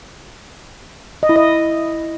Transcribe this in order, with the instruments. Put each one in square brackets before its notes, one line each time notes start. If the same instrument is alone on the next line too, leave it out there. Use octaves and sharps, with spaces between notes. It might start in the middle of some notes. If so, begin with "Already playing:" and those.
[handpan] D#5
E4
D#5